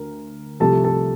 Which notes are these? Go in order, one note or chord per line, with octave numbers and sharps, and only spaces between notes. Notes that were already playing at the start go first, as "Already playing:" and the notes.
Already playing: D2 A#4
C2 C3 F3 A3 A4 A5
A4 A5